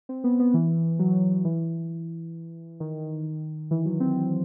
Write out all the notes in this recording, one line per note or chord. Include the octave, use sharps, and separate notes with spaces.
C4
B3
B3
E3
F#3
E3
D#3
E3
F#3
C4